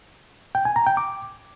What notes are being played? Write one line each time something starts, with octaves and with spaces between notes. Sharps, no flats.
G5
G#5
A#5
G5
D6